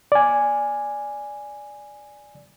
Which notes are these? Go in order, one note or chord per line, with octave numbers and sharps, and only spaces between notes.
D5 G#5